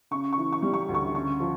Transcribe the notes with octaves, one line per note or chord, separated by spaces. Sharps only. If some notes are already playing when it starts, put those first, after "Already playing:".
C#3 C#6
C#6
E3
C#6
G3
C#6
D2
C#6
C#3 C#6
F3